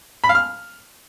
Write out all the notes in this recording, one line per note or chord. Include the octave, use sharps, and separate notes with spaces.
B5
F5
F6